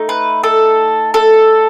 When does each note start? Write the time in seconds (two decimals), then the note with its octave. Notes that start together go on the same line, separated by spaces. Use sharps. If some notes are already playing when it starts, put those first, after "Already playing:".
Already playing: A3 D#4
0.09 B4
0.43 A4
1.14 A4